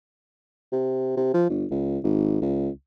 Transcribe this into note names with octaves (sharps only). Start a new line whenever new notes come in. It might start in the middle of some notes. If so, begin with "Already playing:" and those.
C3
C3
F3
G1
C#2
G#1
C#2